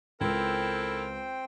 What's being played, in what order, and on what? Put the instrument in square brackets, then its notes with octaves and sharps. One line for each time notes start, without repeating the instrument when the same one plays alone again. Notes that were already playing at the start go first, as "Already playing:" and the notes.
[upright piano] C#2 [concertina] C4 C5 G5 [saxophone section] E4 A4 A#4